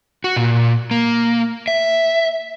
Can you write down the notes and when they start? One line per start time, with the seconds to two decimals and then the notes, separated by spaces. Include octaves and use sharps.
0.24 F#4
0.36 A#2
0.91 A#3
1.68 E5